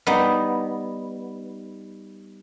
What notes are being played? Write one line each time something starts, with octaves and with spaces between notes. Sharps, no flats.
G3 B3 D#4